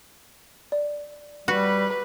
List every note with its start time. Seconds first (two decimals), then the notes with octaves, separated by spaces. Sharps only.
0.72 D5
1.48 G3 F#4 B4